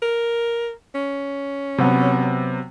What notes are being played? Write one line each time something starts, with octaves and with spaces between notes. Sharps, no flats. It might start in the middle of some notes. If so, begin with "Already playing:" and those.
A#4
C#4
C3 F#3 B3